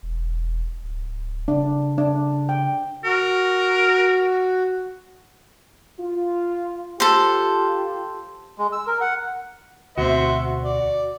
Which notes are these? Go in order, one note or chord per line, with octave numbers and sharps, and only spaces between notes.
E1
D1
C#3 D4
D4
G5
F#4 A#4
F4
F4 G4 A4 C5
G#3
E6
A#4
F#5
D2 B2 C4 F#4 C5 E5
D5